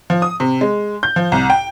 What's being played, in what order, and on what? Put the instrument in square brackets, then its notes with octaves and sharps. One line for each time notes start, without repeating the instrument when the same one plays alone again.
[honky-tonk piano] F3
D#6
C3
G#3
G6
F3
C2
G5